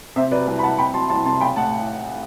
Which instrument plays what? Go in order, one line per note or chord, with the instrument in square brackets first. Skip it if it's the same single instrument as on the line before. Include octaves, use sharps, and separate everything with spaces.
[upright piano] C3 C5 E5
F#3 B4 D5
C2 B4
B5
C2 F#5 A5
C4 G5 B5
F#3 A5 C6
C2 A5 C6
C3 A5 C6
B1 G5 B5
A2 F#5 A5